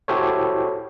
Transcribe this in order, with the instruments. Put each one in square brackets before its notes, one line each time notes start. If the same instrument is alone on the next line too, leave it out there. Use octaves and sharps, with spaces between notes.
[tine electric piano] E4 F#4 G4 A4 C5 C#5